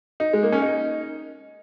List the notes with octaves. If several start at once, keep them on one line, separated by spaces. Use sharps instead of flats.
D#4
G#3
A#3
C#4
D#4